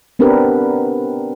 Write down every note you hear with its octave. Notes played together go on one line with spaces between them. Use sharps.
B3 C4 D4 G4 A#4 B4